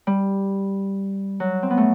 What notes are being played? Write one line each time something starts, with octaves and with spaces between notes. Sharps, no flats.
G3
F#3
C4
B3
A3